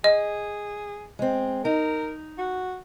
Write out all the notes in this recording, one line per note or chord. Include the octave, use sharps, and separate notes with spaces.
G#4 D#5
G#3 C4
D#4 A#4
F#4